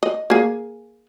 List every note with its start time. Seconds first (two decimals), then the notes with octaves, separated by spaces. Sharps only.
0.03 D#5
0.30 A#3 G#4